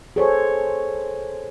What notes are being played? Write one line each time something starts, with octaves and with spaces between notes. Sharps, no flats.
G#4 A4 C5 C#5